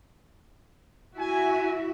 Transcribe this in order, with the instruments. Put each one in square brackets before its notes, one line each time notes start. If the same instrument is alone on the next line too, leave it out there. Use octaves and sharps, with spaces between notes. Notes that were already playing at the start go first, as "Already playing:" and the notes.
[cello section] E4 F#4 E5 [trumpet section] G#5